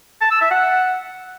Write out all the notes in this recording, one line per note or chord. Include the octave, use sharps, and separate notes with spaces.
A5
E6
E5
F#5